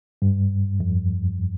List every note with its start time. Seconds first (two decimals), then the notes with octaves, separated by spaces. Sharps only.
0.22 G2
0.80 F2